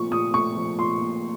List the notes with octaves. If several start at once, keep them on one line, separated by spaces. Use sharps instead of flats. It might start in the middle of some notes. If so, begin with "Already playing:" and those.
Already playing: A#2 F3 A3 C#6
A#2 D#6
A3 C#6
F3
A#2 C6
A#2